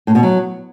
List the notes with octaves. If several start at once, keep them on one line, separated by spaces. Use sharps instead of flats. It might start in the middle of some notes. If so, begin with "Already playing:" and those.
A2
B2
F#3